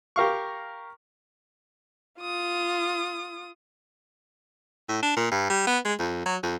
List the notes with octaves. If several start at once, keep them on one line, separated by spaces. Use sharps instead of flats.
G4 A#4 F5 C#6
F4 D#6
A2
D4
A#2
G2
G3
B3
G#3
F2
F#3
F2